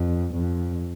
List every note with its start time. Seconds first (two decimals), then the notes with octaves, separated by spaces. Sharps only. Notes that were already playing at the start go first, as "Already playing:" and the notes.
Already playing: F2
0.35 F2